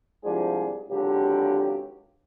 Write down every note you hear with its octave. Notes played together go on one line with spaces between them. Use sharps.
C2 G#2 F3 D4 G#4 C5
G#1 C#2 D3 F#3 G4